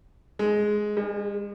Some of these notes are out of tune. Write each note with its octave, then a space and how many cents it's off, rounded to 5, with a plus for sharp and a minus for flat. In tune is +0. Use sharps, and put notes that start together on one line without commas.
G#3 +10
G#3 -40